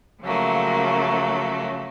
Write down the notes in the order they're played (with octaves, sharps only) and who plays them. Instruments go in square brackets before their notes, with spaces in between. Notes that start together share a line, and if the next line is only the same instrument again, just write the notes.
[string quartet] C#3 F3 F#3 A3 A#3